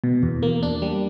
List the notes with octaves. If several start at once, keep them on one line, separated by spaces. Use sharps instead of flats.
B2
E2
A#3
D4
G3